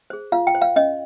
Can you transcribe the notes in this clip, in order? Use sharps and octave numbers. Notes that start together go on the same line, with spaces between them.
G#4 C5
F4 F5
G5
C5
F5
C#4 D#5